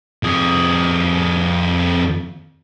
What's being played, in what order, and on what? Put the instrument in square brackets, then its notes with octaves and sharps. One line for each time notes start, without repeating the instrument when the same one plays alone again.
[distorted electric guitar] F2 G#4